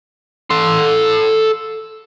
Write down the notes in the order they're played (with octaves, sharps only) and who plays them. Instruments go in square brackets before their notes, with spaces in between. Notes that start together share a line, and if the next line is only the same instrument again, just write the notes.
[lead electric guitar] A4 C6